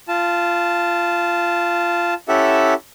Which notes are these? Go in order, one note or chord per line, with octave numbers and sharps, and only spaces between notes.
F4 A5
C#4 E4 G4 A4 E5 F#5